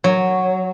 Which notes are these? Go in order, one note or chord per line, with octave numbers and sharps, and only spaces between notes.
F#3